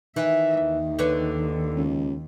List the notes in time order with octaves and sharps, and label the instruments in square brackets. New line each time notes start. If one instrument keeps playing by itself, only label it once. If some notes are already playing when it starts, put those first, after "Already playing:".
[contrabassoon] D#3 [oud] E3 [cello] E5
[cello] D#2
[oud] D3 B4 C#5
[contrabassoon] C#2